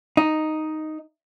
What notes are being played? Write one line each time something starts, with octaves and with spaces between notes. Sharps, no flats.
D#4